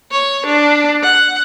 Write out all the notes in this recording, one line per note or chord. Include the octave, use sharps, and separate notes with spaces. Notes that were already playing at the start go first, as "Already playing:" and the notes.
C#5
D4
F#5